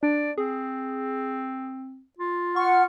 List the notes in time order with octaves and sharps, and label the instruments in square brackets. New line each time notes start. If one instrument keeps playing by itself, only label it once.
[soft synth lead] D4 [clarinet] D5
[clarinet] C4 [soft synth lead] G#4
[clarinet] F4
[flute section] F#5 F6 [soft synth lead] C#6